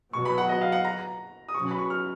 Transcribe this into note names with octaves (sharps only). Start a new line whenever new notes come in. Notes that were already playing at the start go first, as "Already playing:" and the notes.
B2 F#3 B3 C#6
B5
F#5
D#5
F5
F#5
A#5
D#6
B2 F#3 C#4 C#6
B5
C#6
F6